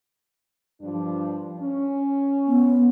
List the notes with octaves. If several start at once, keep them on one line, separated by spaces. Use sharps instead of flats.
G2 F3 D4
C#4
B3